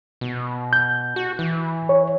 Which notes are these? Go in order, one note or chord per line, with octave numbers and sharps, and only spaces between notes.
B2
G6
F#4
E3
C#5